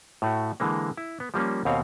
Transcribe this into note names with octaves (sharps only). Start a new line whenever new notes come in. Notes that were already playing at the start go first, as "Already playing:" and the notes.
A2 A3 F#4
D3 E3 G#3 A#3
E4
B3
F3 G3 A#3 C#4
D#2 B2 C4 C#5 F5 A#5